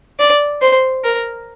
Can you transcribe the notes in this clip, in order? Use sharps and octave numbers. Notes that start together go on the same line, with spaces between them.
D5
C5
A#4